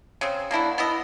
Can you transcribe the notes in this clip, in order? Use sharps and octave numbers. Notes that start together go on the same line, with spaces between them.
C#3 C4
A#3 D4 E4 F#4
B3 E4 D#5